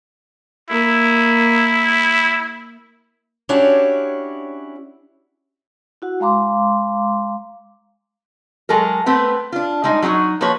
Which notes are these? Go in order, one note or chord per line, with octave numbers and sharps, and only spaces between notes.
A#3 E4
C#4 D4 E4 F#4 G4 C#5
E4 F#4 F#5
G#3 F5 A#5 C6 D6
F#3 G#3 A4 A#4
A3 B3 C4 B4
D4 F4
G3 G#3 D#4
F#3 G3 D#4 F#4
F3 A#3 F#4 B4 C#5